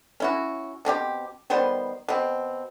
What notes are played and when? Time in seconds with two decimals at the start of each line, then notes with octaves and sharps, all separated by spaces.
0.20 C#4 E4 F#4
0.85 B2 C4 C#4 G4
1.50 D#3 G3 B3 C5
2.08 B2 C4